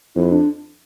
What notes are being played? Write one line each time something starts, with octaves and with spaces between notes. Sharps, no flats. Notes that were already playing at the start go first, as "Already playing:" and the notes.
F2 E4
D4